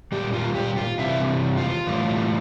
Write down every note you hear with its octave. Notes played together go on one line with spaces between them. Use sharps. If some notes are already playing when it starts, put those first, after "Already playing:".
A#2 G3 G4
F4
G4
F4
C3 E3 G3 E4
F4
A2 E3 G3